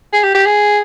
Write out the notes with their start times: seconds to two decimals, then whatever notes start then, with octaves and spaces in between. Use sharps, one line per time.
0.13 G#4
0.23 G4
0.34 G4
0.45 G#4